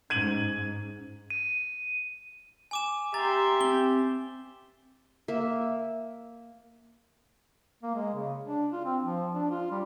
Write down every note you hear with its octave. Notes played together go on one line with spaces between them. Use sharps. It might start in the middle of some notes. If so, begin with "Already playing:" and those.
G#2 C#4 G#6 D#7 F#7
D#7
G#5 D6 E7
G4 E5 A#5 C6 A6
C4 G7
A#3 E5
A#3
G#3
C#3
D4
F4
C4
F3
D4
F4
G3